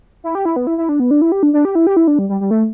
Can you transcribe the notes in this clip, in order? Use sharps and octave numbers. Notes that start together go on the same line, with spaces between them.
E4
G4
E4
B3
E4
E4
D4
B3
D4
E4
G4
D4
D4
G4
E4
G4
E4
D4
G3
G3
G3
A3